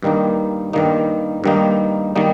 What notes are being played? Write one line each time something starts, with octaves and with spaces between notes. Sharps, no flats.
G2 D#3 G3 A#3 D#4
G2 D#3 G3 A#3 D#4
G2 D#3 G3 A#3 D#4
D#3 G3 A#3 D#4